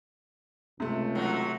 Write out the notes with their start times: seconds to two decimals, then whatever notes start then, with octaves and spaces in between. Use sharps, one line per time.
0.80 C#2 C3 A3
1.15 D#3 F#3